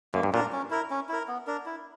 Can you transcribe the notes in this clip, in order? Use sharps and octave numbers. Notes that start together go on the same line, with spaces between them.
F#2 A#3
G2
A#2 D4 A#4
C#4
E4 A#4
C#4
E4 A#4
B3
D4 A#4
E4